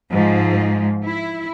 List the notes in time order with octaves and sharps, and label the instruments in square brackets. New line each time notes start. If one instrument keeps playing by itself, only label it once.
[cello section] G#2 F3
E4